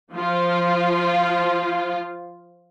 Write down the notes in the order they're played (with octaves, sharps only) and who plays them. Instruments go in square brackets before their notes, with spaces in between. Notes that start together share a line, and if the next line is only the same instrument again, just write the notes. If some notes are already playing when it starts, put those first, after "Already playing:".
[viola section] F3 F4